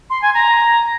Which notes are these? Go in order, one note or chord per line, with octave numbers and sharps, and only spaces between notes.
C6
G#5
A#5